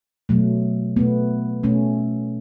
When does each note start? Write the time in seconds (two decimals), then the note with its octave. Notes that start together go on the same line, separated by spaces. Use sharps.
0.29 B2 F#3 A3
0.96 B2 A3 B3
1.63 B2 A3 C#4